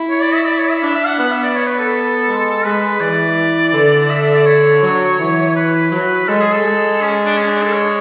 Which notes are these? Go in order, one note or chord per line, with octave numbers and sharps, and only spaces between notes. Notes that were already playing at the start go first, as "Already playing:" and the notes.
Already playing: E4
C#5
D5
E5
D5
C#5
E5
D4 E5
E5
F#5
B3 F#5
E5
D5
C#5
B4
A4
G#3
G#3 B4
E3 D5
D3
E5
E5
D5
C#5
F#3
E3
B4
F#3
G#3 A4
G#4
A4
G#3
C#4
D4
C#4
D4
A4
C#5